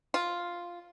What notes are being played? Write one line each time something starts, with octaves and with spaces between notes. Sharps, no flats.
F4